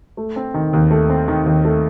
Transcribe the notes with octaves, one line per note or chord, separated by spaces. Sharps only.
A3
C4
D#3
D#2
A3
C4
D#3
D#2
A3